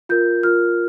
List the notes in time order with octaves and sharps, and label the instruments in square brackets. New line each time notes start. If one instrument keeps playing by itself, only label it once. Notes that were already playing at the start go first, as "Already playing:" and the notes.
[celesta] F4 A#4 G6
F4 A#4 F6